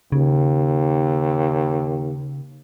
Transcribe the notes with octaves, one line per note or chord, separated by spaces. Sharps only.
D#2 C#3